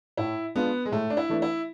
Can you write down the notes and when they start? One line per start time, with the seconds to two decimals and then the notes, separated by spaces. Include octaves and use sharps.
0.17 A2 E4
0.55 G#3 B3 D4 F4
0.85 G#3
0.92 A2 A3
1.10 D4
1.17 E4
1.29 E3 A3 D4
1.42 E4